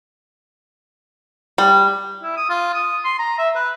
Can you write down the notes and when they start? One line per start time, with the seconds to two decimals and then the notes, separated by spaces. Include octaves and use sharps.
1.58 G3
2.23 E4
2.37 D#6
2.49 F4
2.74 D#6
3.05 C6
3.19 A#5
3.39 E5
3.56 B4